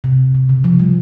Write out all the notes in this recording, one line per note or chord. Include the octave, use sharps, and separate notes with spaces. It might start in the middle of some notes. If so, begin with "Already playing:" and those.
C3
C3
C#3
F3
G3